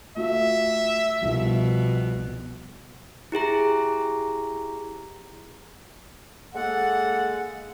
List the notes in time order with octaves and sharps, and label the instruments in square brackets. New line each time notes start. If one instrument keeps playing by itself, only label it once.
[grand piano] A3 F4 F#4 [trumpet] E5
[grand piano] C2 F3 [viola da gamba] B2
[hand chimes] E4 G4 G#4 A#5
[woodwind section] G#3 A#3 A4 F#5